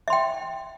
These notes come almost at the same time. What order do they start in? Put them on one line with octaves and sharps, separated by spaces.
E5 C6 G5